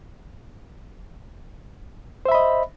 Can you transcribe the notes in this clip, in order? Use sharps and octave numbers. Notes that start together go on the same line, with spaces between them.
C5 D#5 E5 B5